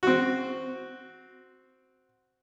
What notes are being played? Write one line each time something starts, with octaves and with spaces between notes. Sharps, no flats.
C4 F#4